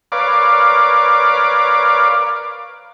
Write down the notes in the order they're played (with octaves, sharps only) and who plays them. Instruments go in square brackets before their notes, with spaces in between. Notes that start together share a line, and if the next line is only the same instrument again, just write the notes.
[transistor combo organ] A#4 B4 C#5 D5 F5 D6